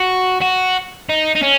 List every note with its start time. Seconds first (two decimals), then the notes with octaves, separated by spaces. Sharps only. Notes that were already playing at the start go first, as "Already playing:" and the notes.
Already playing: F#4
0.42 F#4
1.09 D#4
1.35 D#4
1.42 C#4